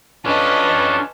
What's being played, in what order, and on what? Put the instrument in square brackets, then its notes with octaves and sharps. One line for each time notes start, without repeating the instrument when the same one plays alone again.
[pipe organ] C#4 D4 [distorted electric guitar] F4 A4 [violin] B4 D#5